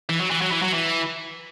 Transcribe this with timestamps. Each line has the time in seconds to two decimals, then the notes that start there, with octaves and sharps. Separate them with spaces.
0.09 E3
0.20 F#3
0.31 E3
0.42 F#3
0.52 E3
0.63 F#3
0.74 E3